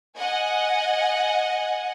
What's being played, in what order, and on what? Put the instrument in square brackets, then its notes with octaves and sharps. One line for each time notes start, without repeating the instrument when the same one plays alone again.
[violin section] D#5 F#5 G#5